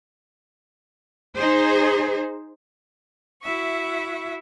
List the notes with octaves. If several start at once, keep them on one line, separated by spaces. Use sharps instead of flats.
D#4 G#4 C5
E4 F#4 E5 C#6